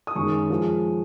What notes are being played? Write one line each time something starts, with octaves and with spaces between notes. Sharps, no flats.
D#6
F#2 D#3 G#3 C#6
F3 G#3